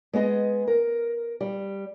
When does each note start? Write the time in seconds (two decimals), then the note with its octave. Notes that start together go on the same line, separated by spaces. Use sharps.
0.13 G#3 B3 G#4 D#5
0.67 A#4
1.41 G3